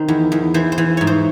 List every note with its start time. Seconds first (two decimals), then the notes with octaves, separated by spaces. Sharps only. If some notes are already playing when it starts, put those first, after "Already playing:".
Already playing: D#3 C5
0.08 E2
0.32 E2
0.54 E3 C5
0.72 C5
0.78 E3
0.97 G#2 C#5
1.07 C5